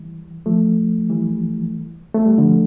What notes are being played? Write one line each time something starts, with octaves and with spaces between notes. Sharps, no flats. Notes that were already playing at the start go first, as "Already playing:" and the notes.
Already playing: E3 G3
F3 A3
E3 G3
A3
G3
D3 F3